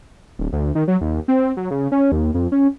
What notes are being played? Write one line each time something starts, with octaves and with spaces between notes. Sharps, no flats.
D1
D2
D#3
F#3
D#2
C4
F#3
C#3
C#4
D#2
F2
C#4